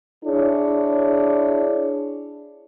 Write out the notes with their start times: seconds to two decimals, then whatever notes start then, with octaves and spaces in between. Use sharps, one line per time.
0.25 D4 E4 G#4 C#5